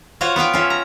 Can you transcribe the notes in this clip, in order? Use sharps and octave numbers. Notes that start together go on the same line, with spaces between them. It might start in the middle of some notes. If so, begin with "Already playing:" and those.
F4 F#4 C5 C#5 F5
B3 F4 F5 G5
C#4 F4 E5
A#5